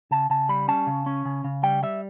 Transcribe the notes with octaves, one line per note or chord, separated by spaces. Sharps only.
C#3 A5
C#3 A5
G3 B5
C#4 A5
C#3
C#4
C#3
C#3
G3 G5
G3 E5